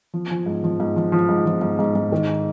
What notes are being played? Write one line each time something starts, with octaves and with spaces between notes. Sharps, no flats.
F3
F3
G#2
F3
G#2
F3
F3
G#2
F3
G#2
G#2
G#2
D#3